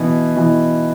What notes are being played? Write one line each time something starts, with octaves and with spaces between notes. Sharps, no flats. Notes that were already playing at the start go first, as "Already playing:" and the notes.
Already playing: B2 E3
B2 E3